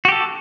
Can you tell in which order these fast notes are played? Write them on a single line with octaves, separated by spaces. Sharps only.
F#4 G4 A4